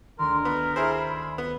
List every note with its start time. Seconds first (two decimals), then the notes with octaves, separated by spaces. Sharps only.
0.19 D2 D#3 A#4 C6
0.45 B3 B5
0.76 E4 G#4 C5
1.38 B3